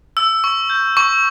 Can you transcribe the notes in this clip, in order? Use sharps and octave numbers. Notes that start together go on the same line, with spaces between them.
E6
C#6
G6
C#6